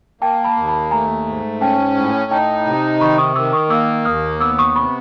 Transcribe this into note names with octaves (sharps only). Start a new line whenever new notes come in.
A#3 G5 A5
A5 B5
D#2
A5 B5
A3 G#5 A#5
G#2
C#4 G5 A5
A2
D#4 G5 A5
C3
D#3 B5 C#6
C#6 D#6
D#3 D6 E6
C#6 D#6
A#3 D6 E6
D#2 D#6 F6
B3 D6 E6
C#6 D#6
C3 B5 C#6